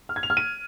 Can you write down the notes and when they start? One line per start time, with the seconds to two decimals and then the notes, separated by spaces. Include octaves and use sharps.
0.09 F6
0.16 G#6
0.23 F7
0.30 F6
0.37 D#7